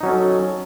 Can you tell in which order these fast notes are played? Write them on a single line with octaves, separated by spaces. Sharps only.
D#4 F#3 C#4 A4